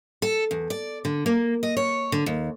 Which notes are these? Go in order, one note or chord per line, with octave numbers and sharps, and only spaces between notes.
A4
E2
D5
D3
A#3
D#5
C#5
D3
D#2